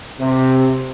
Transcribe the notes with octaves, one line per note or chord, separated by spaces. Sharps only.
C3